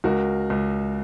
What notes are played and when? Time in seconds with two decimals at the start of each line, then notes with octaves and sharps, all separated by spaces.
0.04 C#2 F#4 A#4
0.50 C#2